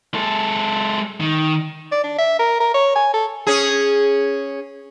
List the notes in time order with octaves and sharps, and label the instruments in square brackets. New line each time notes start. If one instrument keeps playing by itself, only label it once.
[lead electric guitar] G#3 A4
D#3
[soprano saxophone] D5
D4
E5
A#4
A#4
C#5
G#5
A4
[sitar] C#4 G#4